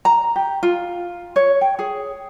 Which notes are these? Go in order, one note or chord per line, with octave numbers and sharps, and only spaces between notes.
A#5
G4
F4
C#5
G5
G#4